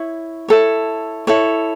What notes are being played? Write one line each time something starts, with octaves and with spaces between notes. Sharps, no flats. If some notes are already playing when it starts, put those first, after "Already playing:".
Already playing: E4 C#5
E4 A4 C#5
E4 A4 C#5